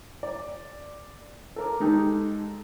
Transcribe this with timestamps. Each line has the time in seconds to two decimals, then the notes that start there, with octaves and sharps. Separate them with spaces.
0.23 D5
1.56 A4 A#4 D6
1.80 G#3 D#4 G4 A4